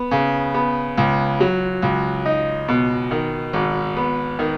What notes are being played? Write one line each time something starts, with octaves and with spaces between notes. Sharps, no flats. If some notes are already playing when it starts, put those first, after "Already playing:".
Already playing: B3
C#3
B3
C#2
F#3
C#2
D#4
B2
D#3
G#1
B3
D#3